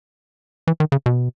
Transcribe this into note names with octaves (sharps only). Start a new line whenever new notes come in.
E3
D#3
C#3
B2